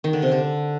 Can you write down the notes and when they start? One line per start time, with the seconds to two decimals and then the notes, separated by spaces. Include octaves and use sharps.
0.04 D#3
0.13 D3
0.22 C3
0.31 D3